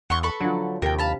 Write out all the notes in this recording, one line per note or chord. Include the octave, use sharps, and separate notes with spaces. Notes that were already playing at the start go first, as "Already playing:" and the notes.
E2 F#5 C6 C#6
A4 B4 B5 C#6
D3 F3 F#3
D#2 C3 A#4 G5
F5 A5 B5